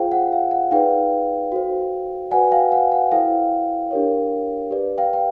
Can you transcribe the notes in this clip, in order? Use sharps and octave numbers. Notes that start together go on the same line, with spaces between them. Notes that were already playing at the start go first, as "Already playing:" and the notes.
Already playing: F4 G#4 C5 F5 G5
F#5
F5
F#5
D#4 G#4 B4 D5 F5 G5
F#4 A4 C5
F#4 B4 D5 F#5 G#5
F5 G5
F#5
F#5
E4 A4 C5 F5 G5
D4 G4 A#4 C#5
G4 B4 D5
F5 G5
G5